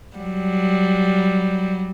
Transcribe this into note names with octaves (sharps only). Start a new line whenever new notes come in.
F#3 G3